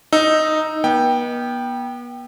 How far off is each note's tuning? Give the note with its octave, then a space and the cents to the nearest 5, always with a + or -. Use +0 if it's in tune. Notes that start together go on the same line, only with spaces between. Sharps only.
D#4 +0 E6 +0
B3 -40 G5 +0